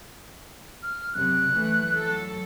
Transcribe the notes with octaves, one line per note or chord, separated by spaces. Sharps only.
F6
F#2 C3 F#6
E3 A3
F#3 A4